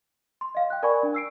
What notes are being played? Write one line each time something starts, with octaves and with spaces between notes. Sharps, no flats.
C6
D#5 F5
G5 F#6
A#4 D5 G#5 B5 C#6
D4
E6 C7 D7